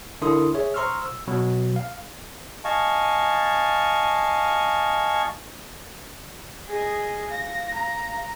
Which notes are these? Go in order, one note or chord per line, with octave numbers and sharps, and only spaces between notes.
D3 D4 E4 A#4 C6 D#6
G#4 C#5 E5
C5 A#5 C6 C#6 E6 F6
E6
B2 F#3
F5
D#5 F5 G#5 A5 C#6
G#4 D#5
F5 A#6
A#5